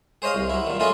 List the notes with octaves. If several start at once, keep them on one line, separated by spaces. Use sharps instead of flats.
G#4 C5 C#5 D#5 F5
C2
F#3 E4
A#2 D#3
A3 C#4 E4 F4 G#4 D#5